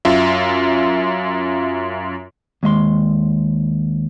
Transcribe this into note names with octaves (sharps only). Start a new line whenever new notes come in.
F#2 F4 E5
D#2 G#3 E5 C6